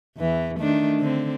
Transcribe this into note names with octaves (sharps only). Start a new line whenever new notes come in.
E2 E3
D#3 A3 D4
D3 C4